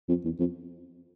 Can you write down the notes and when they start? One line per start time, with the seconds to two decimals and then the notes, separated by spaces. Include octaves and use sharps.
0.09 F2
0.25 E2
0.40 F2